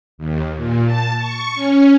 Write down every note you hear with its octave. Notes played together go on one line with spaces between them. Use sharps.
D#2
A#2
A5
C#6
C#4